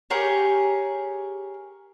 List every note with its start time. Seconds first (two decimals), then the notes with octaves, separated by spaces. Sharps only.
0.10 G4 G#4 A#4 C#5